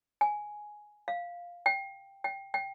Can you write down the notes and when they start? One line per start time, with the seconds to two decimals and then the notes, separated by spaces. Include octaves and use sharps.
0.21 G#5
1.08 F5
1.66 G5
2.24 G5
2.54 G5